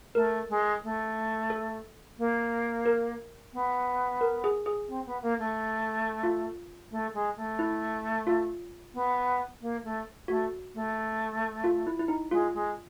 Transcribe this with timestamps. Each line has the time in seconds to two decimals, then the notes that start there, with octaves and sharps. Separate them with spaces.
0.15 A3 A#4
0.49 G#3
0.83 A3
1.50 A4
2.18 A#3
2.86 A#4
3.53 B3
4.21 A#4
4.44 G#4
4.66 G#4
4.88 C4
5.06 B3
5.22 A#3
5.39 A3
6.23 F4
6.91 A3
7.14 G#3
7.37 A3
7.59 E4
8.27 F4
8.94 B3
9.61 A#3
9.84 A3
10.28 A3 F#4
10.74 A3
11.64 F4
11.87 E4
11.99 E4
12.08 D#4
12.31 G#3 F4
12.54 G#3